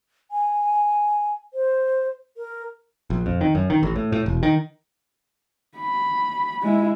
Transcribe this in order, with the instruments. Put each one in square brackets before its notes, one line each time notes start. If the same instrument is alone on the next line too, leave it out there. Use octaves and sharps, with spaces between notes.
[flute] G#5
C5
A#4
[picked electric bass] A#1
F2
D#3
F#2
D#3
A1
A2
A2
E1
D#3
[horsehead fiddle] B5
G#3 E4